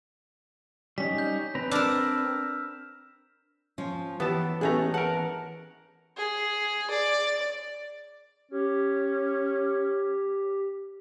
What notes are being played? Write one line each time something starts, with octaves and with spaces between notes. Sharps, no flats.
G3 C#4 D#4 B6
G6
C4 B4 A#5
D4 A#4 E6 F6 E7
F3 C#4
E3 B3 G4 A5
A1 A3 B3 C#4 G#4 A#5 F#6
A#4 F#5 A5
G#4
D5
C#4 G4